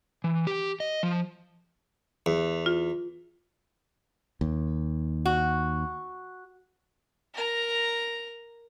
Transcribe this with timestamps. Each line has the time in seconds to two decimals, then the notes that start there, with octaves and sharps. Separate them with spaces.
0.24 E3
0.47 G4
0.80 D#5
1.03 F3
2.26 E2
2.66 F4
4.41 D#2
5.25 F#4
7.34 A#4 A#5